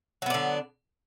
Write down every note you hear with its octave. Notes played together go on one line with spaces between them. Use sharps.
D3 F#3 B3 D4